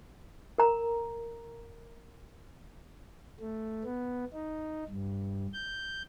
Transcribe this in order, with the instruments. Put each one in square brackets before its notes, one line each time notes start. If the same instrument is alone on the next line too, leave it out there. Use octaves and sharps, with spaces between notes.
[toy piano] A#4 A#5
[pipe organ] A3
B3
D#4
G2
G6